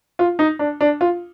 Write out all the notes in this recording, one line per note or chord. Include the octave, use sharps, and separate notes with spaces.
F4
D#4
D4
D4
F4